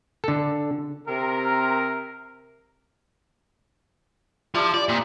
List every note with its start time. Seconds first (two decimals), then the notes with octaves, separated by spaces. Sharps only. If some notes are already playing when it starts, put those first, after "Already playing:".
0.24 D3 A4
1.07 C3 A#4
4.55 F3 D4 E4 G4
4.74 D5
4.89 A#2 C4 D#4